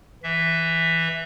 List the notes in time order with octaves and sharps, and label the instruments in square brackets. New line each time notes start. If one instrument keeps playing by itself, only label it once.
[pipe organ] E3 E5